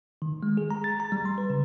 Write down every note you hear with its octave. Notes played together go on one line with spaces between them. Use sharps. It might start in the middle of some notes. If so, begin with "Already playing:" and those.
D#3
G#3
G#4
A#5
A6
A#5
G3
C6
B4
C#3